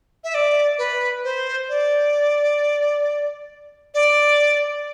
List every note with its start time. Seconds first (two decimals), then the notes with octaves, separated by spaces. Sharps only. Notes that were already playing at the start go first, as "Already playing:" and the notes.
0.24 E5
0.35 D5
0.78 B4
1.24 C5
1.69 D5
3.94 D5